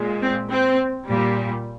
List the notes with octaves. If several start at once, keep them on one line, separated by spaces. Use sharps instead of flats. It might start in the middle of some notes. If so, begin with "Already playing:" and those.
Already playing: A#2 G#3
C4
C4
A#2 G3